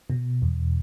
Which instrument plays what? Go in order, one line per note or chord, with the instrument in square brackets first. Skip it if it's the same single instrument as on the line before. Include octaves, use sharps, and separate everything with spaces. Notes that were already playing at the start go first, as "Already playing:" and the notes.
[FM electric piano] B2
E2